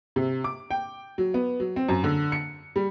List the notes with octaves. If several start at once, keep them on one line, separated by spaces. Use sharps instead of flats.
C3
D6
G5
F#3
B3
F#3
C4
F#2
D3
C#7
G3